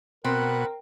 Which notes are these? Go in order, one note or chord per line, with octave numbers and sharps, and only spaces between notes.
B2 C4 A#4 F#5 B5 F#6